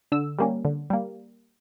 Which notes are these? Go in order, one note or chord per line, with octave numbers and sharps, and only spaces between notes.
D3 E6
G3 A#3 C#4
D3
G3 A#3